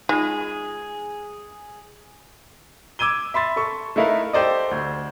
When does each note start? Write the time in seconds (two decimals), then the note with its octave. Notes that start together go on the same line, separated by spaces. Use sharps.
0.09 G#3 D#4 F4 G#4
2.99 D6 E6 G#6 D#7 G7
3.34 E5 B5 C6 A6
3.56 A4 C#6
3.96 A3 D#4 E4 A#4 B4 F5
4.33 G4 A4 C5 D5 D#5
4.71 D2